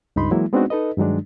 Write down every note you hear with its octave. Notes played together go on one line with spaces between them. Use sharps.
C#2 G2 D#4 B5 C6
E3 F#3 G#3 A#3 E4
G#3 B3 C4 D4 D#4 F#4
D#4 A4 B4 D#5
G2 D#3 F#3 G#3 D4